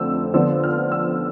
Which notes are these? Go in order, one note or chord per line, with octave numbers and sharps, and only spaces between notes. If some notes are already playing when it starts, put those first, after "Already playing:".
Already playing: F2 D3 F3 A3 D4 E6
D3 F3 B3 D4 E6
F6
E6